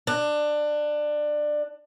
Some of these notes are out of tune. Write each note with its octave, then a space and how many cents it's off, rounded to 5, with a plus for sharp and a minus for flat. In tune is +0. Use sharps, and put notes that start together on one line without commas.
D4 +20